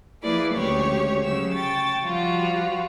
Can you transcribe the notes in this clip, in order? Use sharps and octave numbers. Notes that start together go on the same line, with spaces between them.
F3 A#3 E4 G#4 B4 D5
D2 C#3 G#3 G4 C#5 C#6
C#3 F#3 E6
G5 A5 C#6 A6
F3 G3 F4 F#4